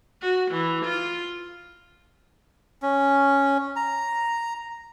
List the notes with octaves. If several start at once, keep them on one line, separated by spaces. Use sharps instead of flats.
F#4
E3
F4
C#4
A#5